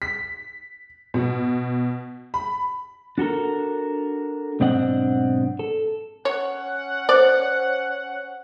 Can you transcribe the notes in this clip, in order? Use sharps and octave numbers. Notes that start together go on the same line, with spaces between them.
B6
B2
B5
D4 F#4 A4 A#4
B1 G#2 C4 D4 D#5 F#5
A4
C#4 C#5 F#5
C5 D5